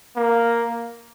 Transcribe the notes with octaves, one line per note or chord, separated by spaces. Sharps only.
A#3